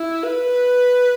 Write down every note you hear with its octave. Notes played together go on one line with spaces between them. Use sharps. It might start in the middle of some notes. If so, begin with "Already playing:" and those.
Already playing: E4
B4